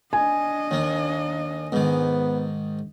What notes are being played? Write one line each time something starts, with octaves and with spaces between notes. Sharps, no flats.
D4 D#5 G#5
D#2 A#3
G#2 D#3 B3